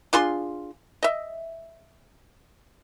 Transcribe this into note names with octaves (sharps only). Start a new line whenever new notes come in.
D4 F4 G#4 C6
D#5 E5